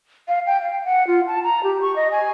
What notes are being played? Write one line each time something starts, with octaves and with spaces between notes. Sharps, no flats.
F5
G5
F5
F#5
F4
A5
A#5
G4
C#6
D#5
G#5